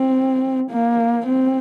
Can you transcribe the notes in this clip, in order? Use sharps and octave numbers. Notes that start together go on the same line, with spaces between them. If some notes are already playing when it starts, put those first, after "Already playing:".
Already playing: C4
A#3
C4